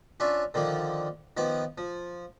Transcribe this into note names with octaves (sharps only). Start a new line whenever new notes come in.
C#4 D4 F4 E5
D3 D#3 F3 A#3
D#3 F3 B3 D6
F3